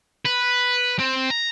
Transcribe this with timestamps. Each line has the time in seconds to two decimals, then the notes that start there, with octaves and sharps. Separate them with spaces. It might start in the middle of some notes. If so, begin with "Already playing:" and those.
0.25 B4
0.99 C4
1.30 A#5